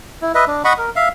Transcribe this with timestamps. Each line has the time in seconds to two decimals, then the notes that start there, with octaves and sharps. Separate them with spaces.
0.22 E4
0.35 B4 D#5 E5
0.48 D4
0.65 D#5 F#5 B5 C#6
0.78 A#4
0.96 E5 F5